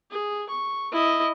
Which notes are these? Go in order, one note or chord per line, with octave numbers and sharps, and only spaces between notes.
G#4
C#6
E4 D#5